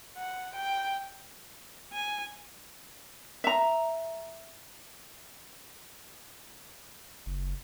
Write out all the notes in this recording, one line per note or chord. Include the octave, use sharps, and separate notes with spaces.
F#5
G5
G#5
E5 A#5
F#1